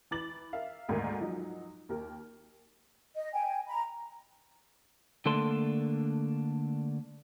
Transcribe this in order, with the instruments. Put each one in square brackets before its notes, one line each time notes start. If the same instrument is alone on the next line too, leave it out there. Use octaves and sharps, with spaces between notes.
[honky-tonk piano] E3 B4 D6 A6 F#7
A#4 E5 F5
D2 G#2 D#3 A#3 A#4
F3 F#3 D#4
D#2 G4 A#4
[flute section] D#5
G5 G#5
A#5 B5
[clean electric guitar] D3 A3 A#3 D4 A4 C6